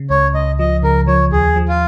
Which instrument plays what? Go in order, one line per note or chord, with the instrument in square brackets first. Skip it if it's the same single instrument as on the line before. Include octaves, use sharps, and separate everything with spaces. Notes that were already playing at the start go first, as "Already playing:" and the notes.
Already playing: [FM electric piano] C#3
[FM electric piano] C#2 [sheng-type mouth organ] C#5
[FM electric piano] C#2 [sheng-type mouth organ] D#5
[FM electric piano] F3 [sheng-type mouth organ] D#5
[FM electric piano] C#3 [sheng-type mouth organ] A#4
[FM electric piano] F3 [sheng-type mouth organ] C#5
[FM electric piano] D#2 [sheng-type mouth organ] G#4
[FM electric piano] F3
[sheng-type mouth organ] F4